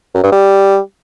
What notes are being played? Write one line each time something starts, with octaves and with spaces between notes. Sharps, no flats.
F#2
G2
G3